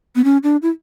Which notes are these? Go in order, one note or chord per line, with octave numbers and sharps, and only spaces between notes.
B3
C#4
D4
E4